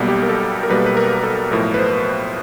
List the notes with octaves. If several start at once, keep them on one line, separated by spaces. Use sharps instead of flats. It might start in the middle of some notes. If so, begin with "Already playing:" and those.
Already playing: B1 B2 G3 A#3
G4
A#4
A4
A#4
B1 B2 G3 A#3 B4
B4
A#4
A4
B1 A2 F3 A#4
B4
C5